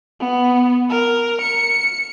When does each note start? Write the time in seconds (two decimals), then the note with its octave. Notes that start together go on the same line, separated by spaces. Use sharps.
0.20 B3
0.90 A#4
1.42 C#7